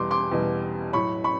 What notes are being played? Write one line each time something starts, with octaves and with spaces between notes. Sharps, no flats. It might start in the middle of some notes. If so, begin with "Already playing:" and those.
Already playing: E2 B2 G3 C6 D6
C6 D6
E2 B2 G3
A2 F#3 B5 C#6
B5 C#6